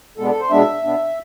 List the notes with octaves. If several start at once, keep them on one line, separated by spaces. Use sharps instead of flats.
B2 G#3 B3 D4 A4
A4
C5
B2 G#3 B3 D4 E5
B2 B3 D4